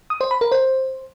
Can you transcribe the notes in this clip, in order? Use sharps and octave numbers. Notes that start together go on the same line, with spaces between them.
D#6
C5
B5
A#4
C5